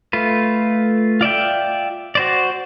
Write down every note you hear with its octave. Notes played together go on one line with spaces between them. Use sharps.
A3 F4 B4
F4 D5 E5 G5
F#4 C5 D5